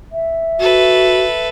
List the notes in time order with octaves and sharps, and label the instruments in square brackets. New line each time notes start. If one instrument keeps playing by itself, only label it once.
[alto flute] E5
[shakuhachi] F#4 [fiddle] A4 B4